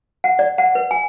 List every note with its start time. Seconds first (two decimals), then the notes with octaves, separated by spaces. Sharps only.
0.24 F#5
0.39 D5
0.58 F#5
0.75 B4
0.91 G#5